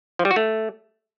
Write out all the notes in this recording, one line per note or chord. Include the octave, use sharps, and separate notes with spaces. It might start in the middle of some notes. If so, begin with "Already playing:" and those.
F3
G3
F#4
A3